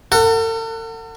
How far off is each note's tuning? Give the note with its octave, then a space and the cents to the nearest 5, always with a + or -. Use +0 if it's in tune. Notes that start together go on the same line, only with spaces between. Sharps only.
A4 +45 F#5 +0